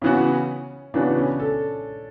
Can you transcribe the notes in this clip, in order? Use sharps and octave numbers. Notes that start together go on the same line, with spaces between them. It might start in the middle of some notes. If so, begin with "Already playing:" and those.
C#3 E3 B3 C#4 F#4
C#3 E3 B3 D4 F#4
C#4
A4